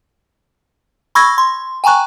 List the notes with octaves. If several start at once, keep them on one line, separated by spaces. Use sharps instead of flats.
B5 C#6 E6 G#6 A#6
C6
G5 G#5 A#5 C#6 F#6